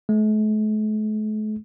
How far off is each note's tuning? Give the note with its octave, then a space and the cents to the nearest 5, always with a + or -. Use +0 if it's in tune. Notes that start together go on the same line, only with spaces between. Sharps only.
A3 -45